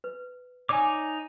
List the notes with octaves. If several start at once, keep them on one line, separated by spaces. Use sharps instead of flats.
B4
D#4 C#5 D5 G#5 D6